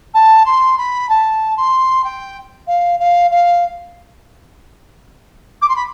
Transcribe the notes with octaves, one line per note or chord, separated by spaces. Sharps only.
A5
C6
B5
A5
C6
G5
F5
F5
F5
D6
C6
B5